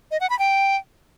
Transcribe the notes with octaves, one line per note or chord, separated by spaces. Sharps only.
D#5
F#5
B5
G5